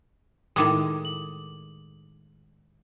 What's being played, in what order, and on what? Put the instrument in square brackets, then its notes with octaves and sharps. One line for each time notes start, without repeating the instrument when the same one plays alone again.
[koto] A2 D#3 G#3 [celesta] E4 D6 D#6
[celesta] F#7